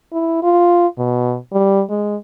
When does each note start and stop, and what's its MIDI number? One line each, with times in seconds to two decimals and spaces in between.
0.12 0.42 64
0.43 0.87 65
0.98 1.36 47
1.52 1.82 55
1.90 2.16 56